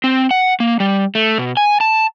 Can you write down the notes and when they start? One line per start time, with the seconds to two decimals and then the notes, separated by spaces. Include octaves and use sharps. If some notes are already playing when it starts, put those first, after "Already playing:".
0.04 C4
0.31 F#5
0.60 A#3
0.80 G3
1.15 A3
1.38 B2
1.57 G#5
1.81 A5